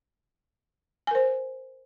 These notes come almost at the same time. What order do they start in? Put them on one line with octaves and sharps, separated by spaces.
G#5 A#4 C5